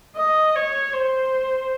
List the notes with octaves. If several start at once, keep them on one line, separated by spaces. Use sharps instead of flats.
D#5
C#5
C5